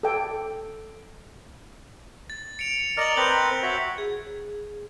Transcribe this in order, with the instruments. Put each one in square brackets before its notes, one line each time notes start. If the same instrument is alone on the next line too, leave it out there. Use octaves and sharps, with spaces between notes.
[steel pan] A4 G5
[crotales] A6
C#7 D7 F7
[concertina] A#4 D5 D#5 [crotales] F6 F7 F#7
[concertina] C4 A#4 B4 [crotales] G6 C#7 F#7
[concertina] F#4 C#5 E5
[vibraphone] G#4